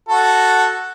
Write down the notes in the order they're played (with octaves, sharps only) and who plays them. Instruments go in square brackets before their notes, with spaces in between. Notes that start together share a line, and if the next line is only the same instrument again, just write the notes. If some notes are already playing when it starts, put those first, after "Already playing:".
[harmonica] F#4 A4